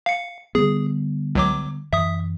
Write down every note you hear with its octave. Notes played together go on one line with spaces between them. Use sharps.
F5 C#7
D3 G3 B3 G#4
C#2 F#3 D6
F#2 E3 E5 D#6